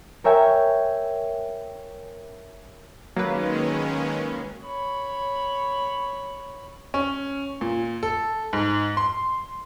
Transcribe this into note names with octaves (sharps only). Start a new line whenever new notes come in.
A#4 C#5 E5 G5 G#5
D#3 F#3 G#3 A#3 C#4 B4
C#5 B5
C#4
A#2
A4
G#2
C6